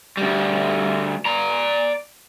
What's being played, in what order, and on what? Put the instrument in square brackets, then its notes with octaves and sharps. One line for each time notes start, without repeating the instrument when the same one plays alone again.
[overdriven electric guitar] D2 G3
D5 A#5